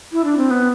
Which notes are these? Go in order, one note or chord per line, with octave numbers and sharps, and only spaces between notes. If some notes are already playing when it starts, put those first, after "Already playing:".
E4
D4
C4
B3